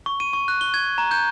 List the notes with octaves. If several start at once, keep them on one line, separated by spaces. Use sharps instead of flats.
C#6
D#7
C#6
F#6
G7
G#6
A#5
G6